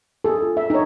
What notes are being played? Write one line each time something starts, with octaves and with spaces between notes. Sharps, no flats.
G#4 A4
F4
E5
D#4 C#5